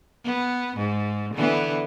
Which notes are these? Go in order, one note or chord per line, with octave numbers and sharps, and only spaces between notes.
B3
G#2
D3 E3 B3